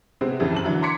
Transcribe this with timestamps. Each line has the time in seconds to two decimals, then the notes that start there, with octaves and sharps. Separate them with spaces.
0.21 C3 G#3 B3 C4
0.40 F2 C#3 E3 G3
0.52 F#2 A5 F#7
0.64 D3 E3 F#3
0.82 A#5 C6 D6 G#6 B6 C#7